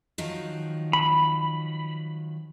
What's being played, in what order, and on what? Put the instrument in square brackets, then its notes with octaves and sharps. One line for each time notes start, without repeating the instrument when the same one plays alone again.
[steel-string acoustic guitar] D#3 F3 F#3
[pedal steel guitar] B5